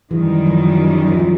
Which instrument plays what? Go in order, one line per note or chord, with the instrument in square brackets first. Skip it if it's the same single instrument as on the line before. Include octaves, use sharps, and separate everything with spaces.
[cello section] F#2 D#3 G3 [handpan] E3
[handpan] F3
F3
F#3